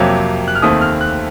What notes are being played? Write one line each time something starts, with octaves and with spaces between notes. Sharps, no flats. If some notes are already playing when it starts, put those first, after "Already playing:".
Already playing: F2 C3 F#3 A#3
F#6
F6
D#2 D#3 A3 C4 D#6
F6
F#6